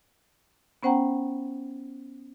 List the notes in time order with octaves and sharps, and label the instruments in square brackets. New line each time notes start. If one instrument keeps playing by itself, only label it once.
[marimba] B3 C#4 C5 F#5 G5 A#5